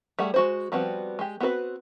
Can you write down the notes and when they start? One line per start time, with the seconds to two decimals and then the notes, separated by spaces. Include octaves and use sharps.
0.19 G3 A3 G#4 F#5
0.34 G#3 F#4 C5
0.72 F3 G3 B3 C4 F#4
1.19 G#3 G4
1.40 B3 C4 F#4 A#4 B4